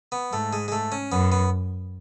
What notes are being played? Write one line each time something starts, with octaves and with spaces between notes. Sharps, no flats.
B3
G#2 A3
G#3
G#3
A3
C#4
F#2 B3
B3